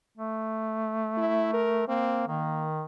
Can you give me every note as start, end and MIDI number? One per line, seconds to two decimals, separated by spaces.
0.18 1.85 57
1.17 1.49 64
1.53 1.83 70
1.88 2.23 58
1.88 2.23 60
2.28 2.84 51
2.28 2.65 58